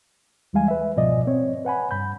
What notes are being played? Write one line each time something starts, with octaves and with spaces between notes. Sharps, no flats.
D#2 E3 G3 G#3 F5 G#5
B4 E5
C#2 G#2 B2 F3 D5 D#5
C4 C#5
B4 F#5 G#5 B5
G2 B5 G6